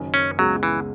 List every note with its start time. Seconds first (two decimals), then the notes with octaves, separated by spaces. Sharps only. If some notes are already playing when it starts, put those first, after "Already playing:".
Already playing: F#1 F#2 D#3
0.14 C#4
0.38 C#2 C#3 F#3 G#3 B3
0.63 E3